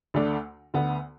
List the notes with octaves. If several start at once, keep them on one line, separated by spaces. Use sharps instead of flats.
D2 D3 A3 D4
D2 D3 B3